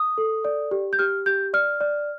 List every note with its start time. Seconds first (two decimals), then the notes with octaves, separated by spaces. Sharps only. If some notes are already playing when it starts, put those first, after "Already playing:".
Already playing: D#6
0.18 A4
0.45 D5
0.71 G4
0.93 G6
0.99 G4 F6
1.26 G4 G6
1.53 D5 F6
1.81 D5